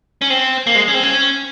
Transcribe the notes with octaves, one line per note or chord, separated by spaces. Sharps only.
C#4
C4
A#3
G#3
C#4
C4
C#4